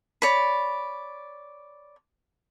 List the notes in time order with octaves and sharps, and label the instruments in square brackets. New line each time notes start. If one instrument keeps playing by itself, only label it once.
[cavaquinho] C#5 D5 B5